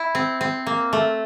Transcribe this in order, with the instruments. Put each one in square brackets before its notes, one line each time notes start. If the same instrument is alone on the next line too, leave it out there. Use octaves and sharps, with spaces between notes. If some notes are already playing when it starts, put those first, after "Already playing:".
Already playing: [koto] E4
C4
C4
A#3
A3